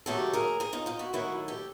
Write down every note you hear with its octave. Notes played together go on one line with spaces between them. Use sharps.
D#2 C#3 F#3 A3 G4 A4
G#4 A#4
G#4 A#4
D#4 F4
D#4 F4
E4 F#4
D#2 D#3 F#3 A3 E4 F#4
G4 A4